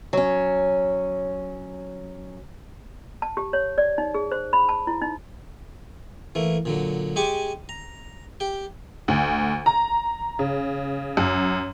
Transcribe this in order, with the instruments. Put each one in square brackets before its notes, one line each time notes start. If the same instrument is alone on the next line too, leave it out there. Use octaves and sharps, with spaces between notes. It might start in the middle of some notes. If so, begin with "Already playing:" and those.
[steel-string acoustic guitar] F#3 C#4
[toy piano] A5
G4
C#5
D5
D#4
G#4
C5
B5
A5
E4
D#4
[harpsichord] E3 A3 A#3
A#2 D3 F#3
G#3 G4 G#5 C#6 D6
A#5
G4 G5
[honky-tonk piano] D2
A#5
C#3
F#2